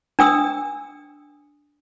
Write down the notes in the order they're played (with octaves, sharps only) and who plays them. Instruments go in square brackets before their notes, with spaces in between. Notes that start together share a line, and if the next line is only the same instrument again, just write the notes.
[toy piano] D4 G5 D#6 E6